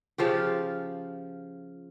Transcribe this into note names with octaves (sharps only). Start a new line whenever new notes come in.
C#3 F3 F4 G4